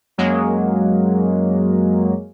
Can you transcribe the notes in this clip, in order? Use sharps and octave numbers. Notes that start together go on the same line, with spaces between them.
F#2 F#3 G#3 A#3